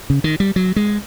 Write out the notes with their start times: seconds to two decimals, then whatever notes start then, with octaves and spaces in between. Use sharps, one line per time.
0.10 C#3
0.24 D#3
0.40 G3
0.56 F#3
0.76 G#3